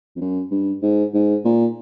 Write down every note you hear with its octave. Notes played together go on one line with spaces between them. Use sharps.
F2
F#2
G2
G#2
G#2
A#2